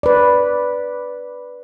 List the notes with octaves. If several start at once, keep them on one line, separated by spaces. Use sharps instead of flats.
B4 D5